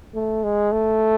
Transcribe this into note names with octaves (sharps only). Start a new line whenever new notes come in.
A3
G#3
A3